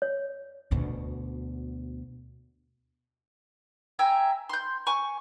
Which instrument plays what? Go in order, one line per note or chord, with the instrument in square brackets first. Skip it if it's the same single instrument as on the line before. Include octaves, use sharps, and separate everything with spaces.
[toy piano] C#5
[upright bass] D2 B2
[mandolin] E5 G5 G#5 A#5
C6 G6
G#5 C#6